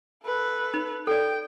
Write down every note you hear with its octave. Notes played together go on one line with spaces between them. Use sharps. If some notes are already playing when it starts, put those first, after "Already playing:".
A4 B4
D#4
A4 D5 G5